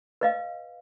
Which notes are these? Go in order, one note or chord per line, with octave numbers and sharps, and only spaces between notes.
B4 D#5 F5